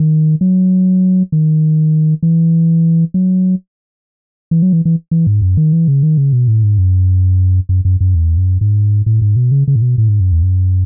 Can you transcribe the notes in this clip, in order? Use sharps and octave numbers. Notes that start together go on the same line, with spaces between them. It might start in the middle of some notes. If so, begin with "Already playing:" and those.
Already playing: D#3
F#3
D#3
E3
F#3
E3
F#3
E3
E3
E3
G#2
F#2
D#3
E3
C#3
D#3
C#3
B2
A2
G#2
F#2
F#2
F#2
F#2
E2
F#2
G#2
A2
G#2
B2
C#3
C#3
A2
B2
A2
G#2
F#2
E2
F#2